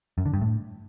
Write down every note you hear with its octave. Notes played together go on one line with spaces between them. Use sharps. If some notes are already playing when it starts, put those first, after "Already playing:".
F#2
D3
G2
A2